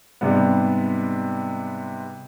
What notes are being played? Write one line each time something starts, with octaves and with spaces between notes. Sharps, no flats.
G#2 C3 G3 B3